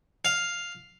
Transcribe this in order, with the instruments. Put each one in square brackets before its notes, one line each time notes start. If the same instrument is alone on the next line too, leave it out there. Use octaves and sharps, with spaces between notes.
[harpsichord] F5